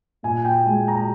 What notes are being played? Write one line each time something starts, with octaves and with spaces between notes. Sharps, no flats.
A#2 G#5
G5
G#3 G#5
A#5